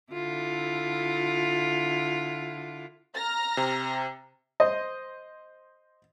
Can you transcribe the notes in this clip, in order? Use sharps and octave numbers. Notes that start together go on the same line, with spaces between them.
D3 E4 F4
A#5 F6 A#6
C3
C5 D#5